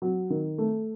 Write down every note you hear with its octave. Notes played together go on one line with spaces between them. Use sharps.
F#3
D#3
A3